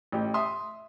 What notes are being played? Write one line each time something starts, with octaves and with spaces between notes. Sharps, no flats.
A1 G4
E5 C6 D#6